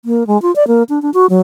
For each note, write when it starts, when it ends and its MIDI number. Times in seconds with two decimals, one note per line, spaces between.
0.05 0.26 58
0.27 0.40 56
0.42 0.54 65
0.56 0.67 74
0.67 0.83 58
0.89 1.01 62
1.02 1.10 62
1.14 1.26 66
1.30 1.40 54